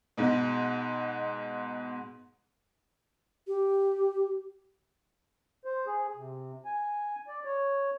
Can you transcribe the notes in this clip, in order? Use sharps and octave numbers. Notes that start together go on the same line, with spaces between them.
G#2 B2
G4
C5
G#4
C3
G#5
D5
C#5